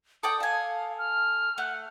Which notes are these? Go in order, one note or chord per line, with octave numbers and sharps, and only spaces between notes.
A4 D5 G5 D#6
A4 F5 G#5
F6
A3 F#5